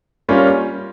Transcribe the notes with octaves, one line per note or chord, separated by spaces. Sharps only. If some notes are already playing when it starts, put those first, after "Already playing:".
G3 A#3 C#4 F4